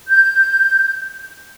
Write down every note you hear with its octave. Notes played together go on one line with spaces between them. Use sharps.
G6